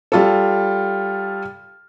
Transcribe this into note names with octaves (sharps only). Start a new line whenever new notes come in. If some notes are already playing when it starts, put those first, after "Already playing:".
G3 F4 A4